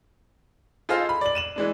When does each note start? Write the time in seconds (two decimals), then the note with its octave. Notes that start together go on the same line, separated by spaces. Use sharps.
0.89 F4 G#4 A4 C5 D#5 F5
1.09 B5
1.21 D5 F#7
1.35 D#7 E7 F#7
1.56 E3 G#3 D4